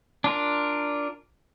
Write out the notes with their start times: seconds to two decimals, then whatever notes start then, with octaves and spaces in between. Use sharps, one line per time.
0.24 D4 F4 A#4